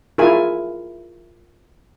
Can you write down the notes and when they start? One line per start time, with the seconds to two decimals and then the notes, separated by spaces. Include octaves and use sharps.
0.18 E4 F4 G#4 A#4 G#5